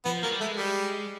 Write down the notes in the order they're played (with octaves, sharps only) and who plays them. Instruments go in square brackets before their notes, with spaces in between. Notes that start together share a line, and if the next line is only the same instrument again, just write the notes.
[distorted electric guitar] F3 [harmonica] B3
[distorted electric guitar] F#3 [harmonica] A#3
[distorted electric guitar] G3
[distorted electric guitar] G#3 [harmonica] A3
[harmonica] G3